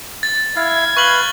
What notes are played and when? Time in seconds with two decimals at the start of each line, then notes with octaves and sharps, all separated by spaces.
0.23 A6
0.56 E4 F5 G#6
0.97 B4 F5 C#6 F#7 G7